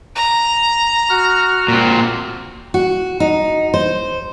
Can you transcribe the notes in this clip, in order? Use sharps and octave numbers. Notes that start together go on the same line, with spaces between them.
A#5
F#4 F6
A#2 C4
F#4
D#4
C5